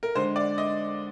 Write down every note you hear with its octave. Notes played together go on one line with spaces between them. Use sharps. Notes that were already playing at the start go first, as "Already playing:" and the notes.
A#4
D3 G#3 C5
D5
D#5